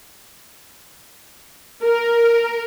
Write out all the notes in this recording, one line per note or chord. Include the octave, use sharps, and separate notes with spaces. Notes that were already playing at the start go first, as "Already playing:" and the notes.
A#4